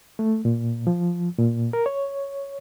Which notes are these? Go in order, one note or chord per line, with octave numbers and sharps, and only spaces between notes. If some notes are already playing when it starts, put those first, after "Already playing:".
A3
A#2
F3
A#2
A#4
C#5